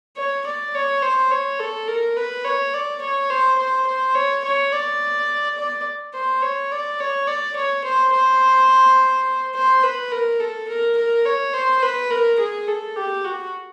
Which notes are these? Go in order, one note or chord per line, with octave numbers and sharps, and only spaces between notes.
C#5
D5
C#5
C5
C#5
A4
A#4
B4
C#5
D5
C#5
C5
C5
C5
C#5
C#5
D5
D5
C5
C#5
D5
C#5
D5
C#5
C5
C5
C5
B4
A#4
A4
A#4
A#4
C#5
C5
B4
A#4
G#4
A4
G4
F#4